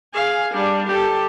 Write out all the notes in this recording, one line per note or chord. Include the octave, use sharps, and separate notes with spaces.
G#4 F5
G3 D4
G4 A4